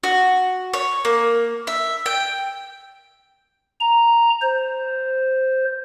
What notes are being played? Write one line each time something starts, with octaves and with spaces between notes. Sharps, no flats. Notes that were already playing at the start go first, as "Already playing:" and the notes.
F#4
C#5
A#3
E5
G5
A#5
C5